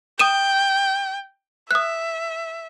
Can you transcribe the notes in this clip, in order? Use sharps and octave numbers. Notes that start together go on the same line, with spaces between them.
G5 D#6 D#7 E7
E5 D#6 F#6